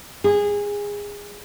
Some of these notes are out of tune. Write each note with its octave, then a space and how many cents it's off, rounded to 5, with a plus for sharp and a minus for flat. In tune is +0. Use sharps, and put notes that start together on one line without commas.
G#4 -20